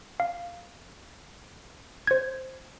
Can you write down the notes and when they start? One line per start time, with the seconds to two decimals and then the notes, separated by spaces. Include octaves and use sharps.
0.20 F5
2.07 C5 G#6